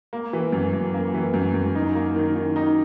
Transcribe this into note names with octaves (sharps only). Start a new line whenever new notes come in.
A#3
E3
F#2
F#2
A#3
E3
F#2
F#2
D#4
A#3
D#3
D#3
D#4